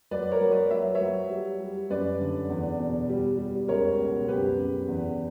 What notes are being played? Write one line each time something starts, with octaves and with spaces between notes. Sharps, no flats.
F#3 B4 D5
A#4 C#5
F#3
B4 D5
F#3 E5
C#5 E5
F#3
G3
G3
F#2 B4 D5
D3
E2
B2
G3
G3
C#2 A#4 C#5
B2
F#2 G4 B4
C#3
E2